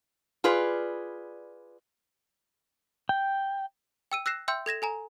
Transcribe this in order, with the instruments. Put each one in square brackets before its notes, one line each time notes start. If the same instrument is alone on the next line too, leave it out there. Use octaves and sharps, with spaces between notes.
[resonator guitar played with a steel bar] F4 G#4 B4 D5
[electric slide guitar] G5
[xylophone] G5 E6 D#7
E6 F#6 A#6 C7 E7
E5 G5 C6 E6 G6
A4 G#6 A#6 E7
A4 G#5 A#5